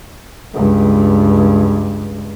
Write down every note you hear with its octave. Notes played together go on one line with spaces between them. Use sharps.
C#2 G2